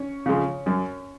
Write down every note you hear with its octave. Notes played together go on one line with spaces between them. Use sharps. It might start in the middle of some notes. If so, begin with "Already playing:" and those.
Already playing: C#4 C#5
C#3 F3 G#3
F#2